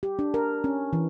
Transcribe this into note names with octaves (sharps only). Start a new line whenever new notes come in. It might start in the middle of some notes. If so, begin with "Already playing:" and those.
G4
D4
A#4
C#4
E3